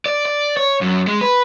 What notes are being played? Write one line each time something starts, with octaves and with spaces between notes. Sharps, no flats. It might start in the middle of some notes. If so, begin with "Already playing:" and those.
D5
D5
C#5
F#2
G#3
B4